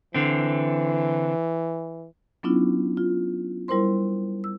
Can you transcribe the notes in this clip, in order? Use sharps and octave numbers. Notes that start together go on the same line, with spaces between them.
D3 E3 C4
F#3 B3 C#4 D4 E4 F4
F4
G3 E4 A#4 C5 C6
E6